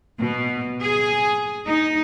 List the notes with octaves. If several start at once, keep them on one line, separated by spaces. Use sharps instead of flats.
B2
G#4
D#4